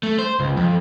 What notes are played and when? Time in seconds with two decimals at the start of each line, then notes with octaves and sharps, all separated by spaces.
0.03 A3
0.19 C5
0.40 C#2
0.57 F2